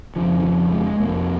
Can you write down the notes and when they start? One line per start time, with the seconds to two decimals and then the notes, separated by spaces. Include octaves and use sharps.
0.16 F2 C#3 F3
0.39 D#3
0.43 F3
0.72 G#3
1.00 F2 C3 A#3